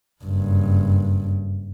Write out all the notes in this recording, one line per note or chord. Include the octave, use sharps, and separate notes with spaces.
F#1 G2